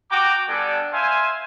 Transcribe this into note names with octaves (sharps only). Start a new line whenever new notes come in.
F#4 G5 A#5 D6
G3 B3 D4 A4 G#5
C5 E5 F5 G#5